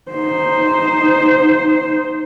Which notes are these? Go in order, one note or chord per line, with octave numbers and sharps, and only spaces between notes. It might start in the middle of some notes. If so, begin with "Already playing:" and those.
D#4 C5